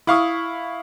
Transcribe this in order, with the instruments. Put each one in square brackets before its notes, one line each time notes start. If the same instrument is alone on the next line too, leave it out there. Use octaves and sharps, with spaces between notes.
[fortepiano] E4 F5 C#6 D#6